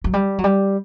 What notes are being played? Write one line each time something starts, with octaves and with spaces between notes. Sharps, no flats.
F#3
G3
F#3
G3